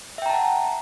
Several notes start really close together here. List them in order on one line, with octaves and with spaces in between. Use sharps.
E5 G5 A#5 A5 F#5